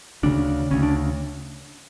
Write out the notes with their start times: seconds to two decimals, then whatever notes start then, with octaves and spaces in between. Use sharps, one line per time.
0.23 D2 C#3 D4
0.71 D2 C#3 C#4
0.83 D4